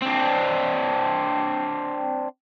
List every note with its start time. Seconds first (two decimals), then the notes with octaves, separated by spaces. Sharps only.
0.02 C4 D4